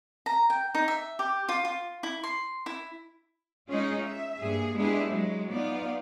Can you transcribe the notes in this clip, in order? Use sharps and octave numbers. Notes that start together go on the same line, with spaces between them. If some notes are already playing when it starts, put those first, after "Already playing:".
A#5
G5
D#4
E5
G4
F4
F4
E4
C6
E4
G#3 C#4 D#4 F4 G#4
E5
G2 A#3 G#4
G#3 B3 D4 E4 G4 G#4
F#3 G#3
B3 D#4 F4 D5